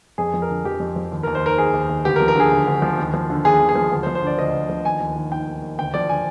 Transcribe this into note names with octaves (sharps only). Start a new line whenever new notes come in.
F2 G#4
F3
A#4
D3
F2 G4
F2
F3
D#2
D#2 A#4
C5
D#3 A#4
D#3 G#4
D#2
D#2
D2 G4
A#4
F3
A#4
D3 G#4
D2
D2
F3
D#2
F3
D3
D#2 G#4
D#2
G#4
F3
D2
C5
F3
C5
D3 D5
D2 D#5
D2
F3
D#2 G#5
D#2
D#3
D#3 G5
D#2
D#2
D2 G5
F3 D5
D3 G#5